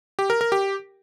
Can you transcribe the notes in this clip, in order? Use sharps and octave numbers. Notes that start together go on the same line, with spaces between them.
G4
A#4
A#4
G4